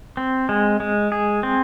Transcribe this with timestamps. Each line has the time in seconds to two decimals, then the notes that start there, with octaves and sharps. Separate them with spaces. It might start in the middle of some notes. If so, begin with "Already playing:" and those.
0.17 C4
0.49 G#3
0.80 G#3
1.12 G#4
1.43 C4